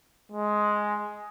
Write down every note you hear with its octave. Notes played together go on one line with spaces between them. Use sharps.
G#3